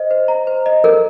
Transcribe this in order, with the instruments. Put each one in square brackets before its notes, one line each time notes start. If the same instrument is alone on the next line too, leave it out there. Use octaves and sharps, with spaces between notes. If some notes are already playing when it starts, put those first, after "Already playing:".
Already playing: [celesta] C5 D#5
C5
A#5
C5
D#5
[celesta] A4 [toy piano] A#4